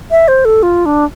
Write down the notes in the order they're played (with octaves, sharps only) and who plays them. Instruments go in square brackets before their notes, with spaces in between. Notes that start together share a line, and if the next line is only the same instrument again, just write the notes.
[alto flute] E5
C5
A4
F4
D4